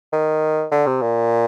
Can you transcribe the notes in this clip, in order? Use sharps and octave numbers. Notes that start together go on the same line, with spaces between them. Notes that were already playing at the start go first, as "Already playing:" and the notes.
D#3
D3
C3
A#2